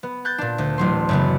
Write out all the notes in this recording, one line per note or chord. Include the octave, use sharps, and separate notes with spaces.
B3
F#6 G6 A6
A#2 D4
D2
A1 F#3 C6
F#2 C#3 B3